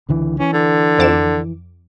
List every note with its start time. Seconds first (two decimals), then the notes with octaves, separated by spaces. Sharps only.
0.09 C#2 D3 E3
0.40 E3 C#4
0.53 D3
0.99 F2 D6 E7